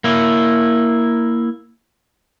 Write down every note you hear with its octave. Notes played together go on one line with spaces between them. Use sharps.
A#3 E4